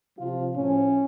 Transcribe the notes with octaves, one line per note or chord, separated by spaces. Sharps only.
C3 F3 F4
A2 F3 C#4